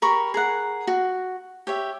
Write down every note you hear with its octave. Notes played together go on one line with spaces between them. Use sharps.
G4 A#4 B5 C#6
G#4 A#4 F#5
F#4
G4 C#5 E5